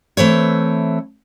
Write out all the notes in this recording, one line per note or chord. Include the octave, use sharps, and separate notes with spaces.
E3 A3 C4 C#5